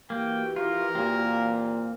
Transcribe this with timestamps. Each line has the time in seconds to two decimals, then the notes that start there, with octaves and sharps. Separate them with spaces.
0.10 E3 A#3 F#4 G4 G5
0.56 F4 A#4
0.95 A#2 A#3 C4